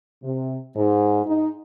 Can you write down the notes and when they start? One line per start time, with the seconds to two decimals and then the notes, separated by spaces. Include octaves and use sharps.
0.24 C3
0.76 G#2
1.27 D#4